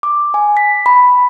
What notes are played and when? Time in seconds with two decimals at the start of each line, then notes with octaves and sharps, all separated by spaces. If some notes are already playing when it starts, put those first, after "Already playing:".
0.03 D6
0.34 G#5
0.57 B6
0.86 B5